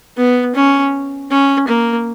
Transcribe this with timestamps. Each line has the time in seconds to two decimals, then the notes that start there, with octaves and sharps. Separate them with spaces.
0.17 B3
0.55 C#4
1.31 C#4
1.68 A#3